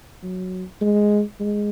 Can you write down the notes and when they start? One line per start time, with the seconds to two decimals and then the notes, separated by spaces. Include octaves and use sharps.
0.23 F#3
0.81 G#3
1.40 G#3